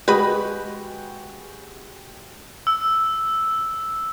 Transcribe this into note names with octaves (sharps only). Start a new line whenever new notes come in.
G#3 F#4 G4 B4 D#5 B5
E6